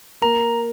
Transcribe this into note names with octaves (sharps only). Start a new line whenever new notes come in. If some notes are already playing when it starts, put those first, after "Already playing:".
A#3 A#5